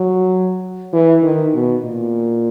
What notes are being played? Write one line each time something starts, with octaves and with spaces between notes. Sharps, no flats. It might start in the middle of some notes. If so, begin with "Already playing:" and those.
Already playing: F#3
E3
D#3
B2
A#2